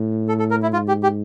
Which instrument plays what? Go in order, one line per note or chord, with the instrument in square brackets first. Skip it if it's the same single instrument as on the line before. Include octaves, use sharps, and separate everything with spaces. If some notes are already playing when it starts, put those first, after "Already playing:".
Already playing: [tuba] A2
[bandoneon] A4
A4
A#4
E4
[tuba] G#2 [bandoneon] F4
[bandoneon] G4
G4